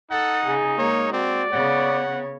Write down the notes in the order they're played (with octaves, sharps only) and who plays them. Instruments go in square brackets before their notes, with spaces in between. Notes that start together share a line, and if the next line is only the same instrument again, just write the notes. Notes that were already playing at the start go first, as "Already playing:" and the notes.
[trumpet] D#4 [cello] A4 [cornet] F#5
[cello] C#3 [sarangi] G#4
[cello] G#3 [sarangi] A#3 [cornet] C#5
[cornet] C4 [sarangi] F#4 [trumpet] D5
[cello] C#3 B3 [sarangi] C#5 [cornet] F#5